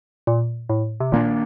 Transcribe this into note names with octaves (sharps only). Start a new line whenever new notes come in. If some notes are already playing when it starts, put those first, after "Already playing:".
A#2
A2
C3
A#2 D#3 A#3 D4